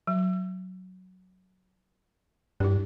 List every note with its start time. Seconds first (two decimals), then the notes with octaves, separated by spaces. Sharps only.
0.07 F#3
2.60 G2 E4 G4